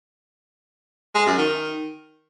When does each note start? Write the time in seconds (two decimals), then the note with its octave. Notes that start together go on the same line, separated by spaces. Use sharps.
1.15 G#3
1.26 F#2
1.37 D#3